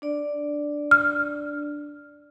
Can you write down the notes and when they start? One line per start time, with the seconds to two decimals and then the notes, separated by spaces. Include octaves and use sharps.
0.02 D4 D5
0.91 F6